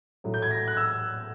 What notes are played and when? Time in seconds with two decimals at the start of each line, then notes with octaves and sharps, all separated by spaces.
0.24 A2 F#3 A3
0.34 G6
0.42 G#6
0.51 A#6
0.68 F#6
0.77 E6